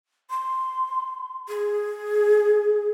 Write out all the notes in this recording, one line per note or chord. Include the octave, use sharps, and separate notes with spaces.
C6
G#4